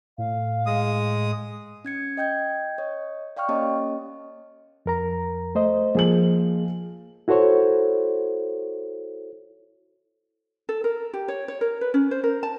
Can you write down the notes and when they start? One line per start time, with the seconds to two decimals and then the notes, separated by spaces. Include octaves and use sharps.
0.18 A2 F5
0.66 G#3 D#6
1.85 C#4 G#6 C#7
2.17 D#5 G5 G6 G#6
2.78 C#5 D#5
3.37 D5 F5 G5 C#6 F6
3.48 A#3 C#4 G4 C#5 D#5 A5
4.86 F2 A#4 A#5
5.55 A3 C5 D#5
5.95 F3 A#3 G#4 F#7
7.28 E4 F#4 A4 C5 C#5
10.69 A4
10.84 A#4
11.14 G4
11.28 C#5
11.48 C#5
11.61 A#4
11.81 B4
11.94 C#4
12.11 C5
12.24 A#4
12.43 A5